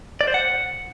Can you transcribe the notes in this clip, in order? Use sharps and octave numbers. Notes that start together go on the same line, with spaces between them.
D5
C5
F#5